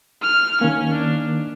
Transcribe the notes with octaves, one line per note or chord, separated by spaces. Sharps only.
F6
D#3 A#3 C#4
D4